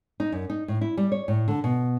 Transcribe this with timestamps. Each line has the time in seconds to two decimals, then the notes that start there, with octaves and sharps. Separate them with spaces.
0.20 D#4
0.32 F#2
0.50 D#4
0.68 A2
0.81 E4
0.97 G3
1.12 C#5
1.28 A2
1.48 D3
1.64 B2